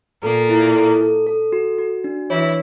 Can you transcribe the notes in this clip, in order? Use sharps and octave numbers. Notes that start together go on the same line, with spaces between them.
A#2 A#3 A4
E4
A4
A4
A4
F#4
F#4
D4
E3 E4 C#5